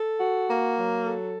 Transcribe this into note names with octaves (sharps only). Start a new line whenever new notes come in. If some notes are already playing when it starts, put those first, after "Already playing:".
Already playing: A4
F#4
A#3
F#3
A4